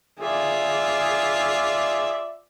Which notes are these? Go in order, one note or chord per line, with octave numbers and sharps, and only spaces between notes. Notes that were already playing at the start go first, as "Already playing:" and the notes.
F4 G#4 D5 E5